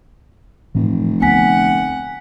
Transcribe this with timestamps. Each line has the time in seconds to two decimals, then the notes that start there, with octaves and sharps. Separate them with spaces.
0.75 F1 A2 E3
1.22 D2 B3 F#5 G#5 B6